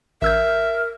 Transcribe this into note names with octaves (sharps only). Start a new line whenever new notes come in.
A1 A#4 E5 E6 G6